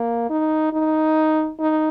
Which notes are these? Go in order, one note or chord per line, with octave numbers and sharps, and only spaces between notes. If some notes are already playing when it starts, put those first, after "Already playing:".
Already playing: A#3
D#4
D#4
D#4